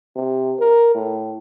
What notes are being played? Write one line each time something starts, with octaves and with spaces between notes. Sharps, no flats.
C3
A#4
A2